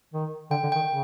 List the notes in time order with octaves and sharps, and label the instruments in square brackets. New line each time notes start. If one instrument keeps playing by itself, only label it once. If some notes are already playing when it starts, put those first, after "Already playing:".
[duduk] D#3
[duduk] D3 [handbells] G5
[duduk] D3
[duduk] D#3 [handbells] G5
[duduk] C#3